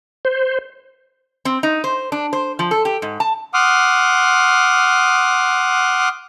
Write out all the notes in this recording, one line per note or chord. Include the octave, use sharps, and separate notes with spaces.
C5
C4
D#4
C5
D4
C5
F3
A4
G4
G#2
A5
F#5 C6 D6 D#6 F6